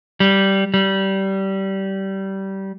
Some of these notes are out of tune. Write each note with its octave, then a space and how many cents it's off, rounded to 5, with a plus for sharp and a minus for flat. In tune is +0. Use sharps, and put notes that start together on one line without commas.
G3 -10
G3 -20